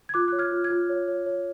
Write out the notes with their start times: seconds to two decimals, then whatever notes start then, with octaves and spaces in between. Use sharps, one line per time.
0.09 G#6
0.14 F4 D6 F#6
0.28 C#5 F#6
0.39 F6 G#6
0.52 F4
0.64 F6 G#6
0.70 F4
0.90 C#5
1.08 C#5
1.26 C#5